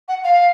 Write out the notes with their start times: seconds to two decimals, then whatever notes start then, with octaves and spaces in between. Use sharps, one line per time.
0.08 F#5
0.24 F5